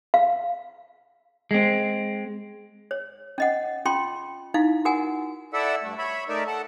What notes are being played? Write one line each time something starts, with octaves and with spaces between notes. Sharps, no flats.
F5
G#3 C4
C#5
C#4 D#5 F#5
C#4 F4 G5 C6
D#4 E4 F5
F#4 A#4 F#5 G#5
E4 A4 D5 E5 F#5 E6
G2 A3
C#5 E5 B5
A3 D#4 A#4 D5 E5
A4 F#5 A5